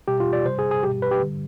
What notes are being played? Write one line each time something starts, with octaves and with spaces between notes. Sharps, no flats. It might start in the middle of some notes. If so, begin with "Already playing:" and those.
B2 G3 G4
F4
D5
C3 G3 C5
G#4
G#4
B2 G3 G4
B4
G4
D3 G3